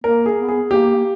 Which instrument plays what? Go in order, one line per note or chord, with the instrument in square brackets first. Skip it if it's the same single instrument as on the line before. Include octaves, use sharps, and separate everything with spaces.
[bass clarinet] A#3 [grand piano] A#4
[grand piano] G#4
[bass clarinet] B3
[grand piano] G#4
[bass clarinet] A#3 [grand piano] G4
[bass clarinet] A#3